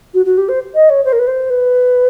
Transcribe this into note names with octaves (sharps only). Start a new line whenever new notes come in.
F#4
F#4
G4
C5
D#5
C#5
C5
A#4
B4
C5
B4